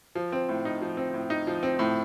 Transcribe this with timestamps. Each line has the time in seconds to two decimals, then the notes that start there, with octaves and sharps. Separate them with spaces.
0.15 F3
0.32 C4
0.49 A2
0.65 D#4
0.81 F3
0.97 C4
1.14 A2
1.30 D#4
1.47 F3
1.63 C4
1.79 A2